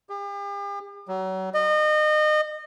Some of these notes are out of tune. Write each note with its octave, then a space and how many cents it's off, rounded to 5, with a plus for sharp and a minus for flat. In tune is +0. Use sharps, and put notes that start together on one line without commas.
G4 +45
F#3 +35
D#5 -30